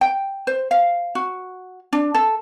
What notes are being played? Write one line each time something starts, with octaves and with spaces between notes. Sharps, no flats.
G5
C5
F5
F#4
D4
A4